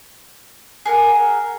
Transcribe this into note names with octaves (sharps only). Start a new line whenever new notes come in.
G#4 A#4 F#5